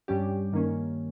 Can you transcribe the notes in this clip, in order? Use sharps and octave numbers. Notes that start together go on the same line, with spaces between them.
G2 G3 C#4 G4
G2 D#3 A#3 C#4